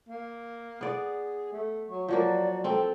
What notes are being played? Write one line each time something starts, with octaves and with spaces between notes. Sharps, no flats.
A#3
B3 G#4 D5
A3
F#3 C#6
F3 F#3 A#3 F#4 D5
C4 A4 G5